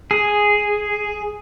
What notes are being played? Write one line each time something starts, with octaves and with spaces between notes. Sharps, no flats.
G#4